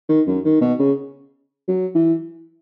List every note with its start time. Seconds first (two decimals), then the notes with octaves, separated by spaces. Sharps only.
0.09 D#3
0.27 F#2
0.44 D#3
0.61 B2
0.79 C#3
1.68 F#3
1.95 E3